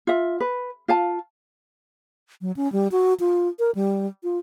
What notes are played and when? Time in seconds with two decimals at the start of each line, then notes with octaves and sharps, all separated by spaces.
0.07 F4 E5
0.40 B4
0.88 F4 F5 A5
2.41 F#3
2.56 C#4
2.72 G3
2.92 F#4
3.20 F4
3.59 A#4
3.75 G3
4.23 F4